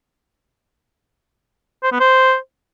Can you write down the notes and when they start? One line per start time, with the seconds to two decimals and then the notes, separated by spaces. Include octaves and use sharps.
1.83 C5
1.92 B3
2.00 C5